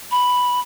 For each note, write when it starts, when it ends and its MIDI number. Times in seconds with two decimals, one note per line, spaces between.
0.11 0.60 83